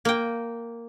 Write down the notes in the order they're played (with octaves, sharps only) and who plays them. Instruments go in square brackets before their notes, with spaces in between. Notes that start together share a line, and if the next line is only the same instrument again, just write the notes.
[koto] A#3 G5